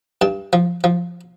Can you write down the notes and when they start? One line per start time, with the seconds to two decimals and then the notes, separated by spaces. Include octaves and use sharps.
0.21 G2 A5
0.53 F3
0.84 F3